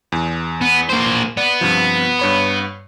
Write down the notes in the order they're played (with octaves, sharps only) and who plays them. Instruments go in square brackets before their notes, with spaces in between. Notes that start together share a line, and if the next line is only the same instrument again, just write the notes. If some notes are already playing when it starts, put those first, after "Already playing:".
[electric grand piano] E2
[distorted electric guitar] B3
A#3 C5
[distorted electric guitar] B3 [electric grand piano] D5
[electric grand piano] G2 C3 F3
G2 C#5 B5